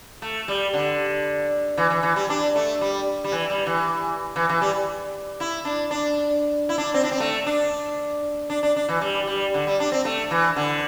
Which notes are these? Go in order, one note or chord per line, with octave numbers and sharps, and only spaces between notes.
A3
G3
D3
E3
E3
E3
G3
D4
A3
G3
G3
E3
G3
E3
E3
E3
G3
E4
D4
D4
E4
D4
C4
D4
C4
A3
D4
D4
D4
D4
E3
G3
G3
D3
G3
D4
C4
A3
E3
D3